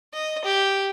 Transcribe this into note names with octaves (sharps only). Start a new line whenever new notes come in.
D#5
G4